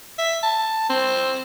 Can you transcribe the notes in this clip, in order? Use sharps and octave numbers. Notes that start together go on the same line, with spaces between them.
E5
A5
C4